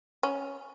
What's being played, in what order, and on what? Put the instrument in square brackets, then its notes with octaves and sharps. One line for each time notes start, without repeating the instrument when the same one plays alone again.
[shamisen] C#4